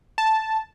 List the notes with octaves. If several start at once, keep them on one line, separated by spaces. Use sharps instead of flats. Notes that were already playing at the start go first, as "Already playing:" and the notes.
A5